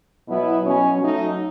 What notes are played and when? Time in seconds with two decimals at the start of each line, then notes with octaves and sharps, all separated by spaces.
0.27 B2 F#3 B3 E4
0.63 B2 F#3 C#4
0.99 F#3 A3 D#4